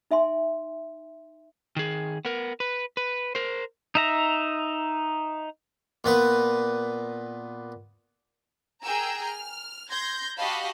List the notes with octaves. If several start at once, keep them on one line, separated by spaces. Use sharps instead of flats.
D#4 E5 G#5 C6
D#3 G#4
B3 A#4
B4
B4
A#4 C5
D#4 E5 A#5
A#2 B3 B4
G#4 A#4 G5 G#5 A#5 E6
F6
C6 G6 G#6 A#6
F#4 G4 D#5 F5 A5 B5